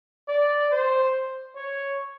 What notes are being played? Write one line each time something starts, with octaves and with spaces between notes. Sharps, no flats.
D5
C5
C#5